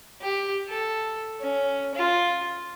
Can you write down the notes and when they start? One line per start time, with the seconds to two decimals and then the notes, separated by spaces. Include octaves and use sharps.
0.21 G4
0.68 A4
1.41 C#4
1.95 F4